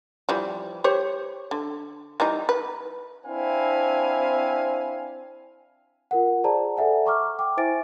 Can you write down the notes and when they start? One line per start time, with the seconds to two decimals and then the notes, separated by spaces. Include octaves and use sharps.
0.29 E3 F3 G3
0.84 G4 C5 C#5
1.51 D3
2.20 E3 G3 D#4
2.49 B4
3.26 C4 D4 E4 C5 F5 G#5
6.11 F4 A#4 F#5
6.44 G#4 C5 D5 A5 A#5
6.77 A4 D5 E5 F#5 G#5
7.06 A#5 C#6 D6 F6
7.39 G5 D6
7.57 E4 C5 E5 G#5 A6 D7